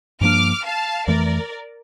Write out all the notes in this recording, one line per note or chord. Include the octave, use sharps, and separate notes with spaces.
G2 F3 A#3 D4 D6 F6
F5 A5
F2 E3 A3 A#4 D5